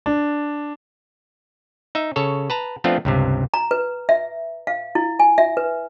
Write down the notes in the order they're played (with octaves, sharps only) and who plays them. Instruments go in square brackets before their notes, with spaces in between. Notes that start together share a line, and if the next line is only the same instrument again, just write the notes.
[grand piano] D4
[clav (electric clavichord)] D#4 E5
C#3 A4 C#5
B4 A5 A#5
F3 A3 B3 C4 D4 F4
C#2 G2 C3
[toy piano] A#5
B4
E5
F5
E4
G#5
E5
B4